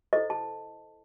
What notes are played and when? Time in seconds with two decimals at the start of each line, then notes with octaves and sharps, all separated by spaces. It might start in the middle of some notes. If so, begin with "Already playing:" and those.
0.13 E4 A4 C5 D#5
0.30 A5